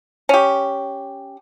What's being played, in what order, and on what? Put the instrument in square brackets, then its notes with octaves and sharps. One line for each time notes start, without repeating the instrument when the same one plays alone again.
[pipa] C#4 G4